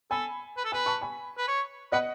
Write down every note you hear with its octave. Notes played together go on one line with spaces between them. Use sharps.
A4 G#5 B5
B4
A4
B4 G#5 B5
A5 C#6
G#5 B5
B4
C#5
B4 D#5 F#5